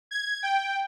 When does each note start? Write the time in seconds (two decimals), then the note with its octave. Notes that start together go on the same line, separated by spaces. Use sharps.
0.11 G#6
0.43 G5